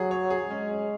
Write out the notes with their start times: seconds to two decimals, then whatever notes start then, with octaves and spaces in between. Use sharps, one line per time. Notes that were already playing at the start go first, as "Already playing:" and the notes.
Already playing: F#3 G#4
0.11 C#5
0.30 G#4
0.49 G#3 C#4
0.69 C#4